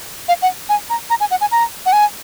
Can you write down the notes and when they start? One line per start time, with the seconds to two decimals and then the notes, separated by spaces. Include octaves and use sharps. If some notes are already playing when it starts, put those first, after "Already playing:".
0.28 F5
0.42 F#5
0.69 G#5
0.90 A#5
1.10 A#5
1.20 G#5
1.31 F#5
1.41 G#5
1.51 A#5
1.86 F#5
1.93 G#5